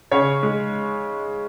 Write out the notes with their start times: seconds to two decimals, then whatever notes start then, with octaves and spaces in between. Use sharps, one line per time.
0.11 C#3 C#5
0.43 G#3